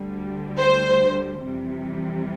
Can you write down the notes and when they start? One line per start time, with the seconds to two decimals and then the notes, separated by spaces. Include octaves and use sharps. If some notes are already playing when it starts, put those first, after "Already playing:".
Already playing: D2 D3 G3
0.60 C5
1.43 F2 C3 E3 G3